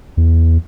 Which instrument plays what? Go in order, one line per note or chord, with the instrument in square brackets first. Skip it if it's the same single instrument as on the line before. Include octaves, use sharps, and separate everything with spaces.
[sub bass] E2